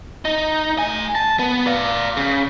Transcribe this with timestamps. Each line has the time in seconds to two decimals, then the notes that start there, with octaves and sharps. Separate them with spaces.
0.25 D#4
0.78 A3 G#5
1.15 A5
1.39 B3
1.66 D5 F5
2.17 C#3